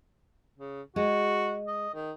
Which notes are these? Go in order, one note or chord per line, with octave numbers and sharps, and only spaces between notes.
C#3
G#3 F#4
D#5
D#3